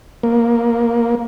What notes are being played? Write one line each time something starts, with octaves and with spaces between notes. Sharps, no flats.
A#3